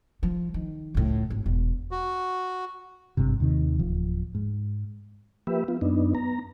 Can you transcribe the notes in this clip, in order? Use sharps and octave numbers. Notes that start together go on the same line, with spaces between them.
F3
D#3
C#2 A2
G#1
E1
F#4
G#1 G2 C3
D#2 C3 D#3
D1 F3
G#2
F3 A#3 G4 B4 E5
B3 F4
F#2 B3 D4 D#4
B3 A#5